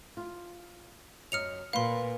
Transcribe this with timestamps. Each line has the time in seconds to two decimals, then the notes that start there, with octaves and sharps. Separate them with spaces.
0.17 F4
1.32 F#2 F#3 D#5 F6 C#7 F7
1.73 A#2 B4 F5 C6